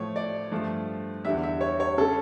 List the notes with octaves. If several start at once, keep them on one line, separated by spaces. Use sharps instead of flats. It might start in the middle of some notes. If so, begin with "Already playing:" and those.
Already playing: A2 F3 A3 C#5
D5
G2 F3 A3
E2 D3 G3 E5
E5
C#5
C#5
C#3 G3 A4